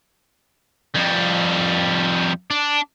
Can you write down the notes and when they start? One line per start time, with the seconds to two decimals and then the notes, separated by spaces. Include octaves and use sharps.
0.94 F2 G3
2.51 D4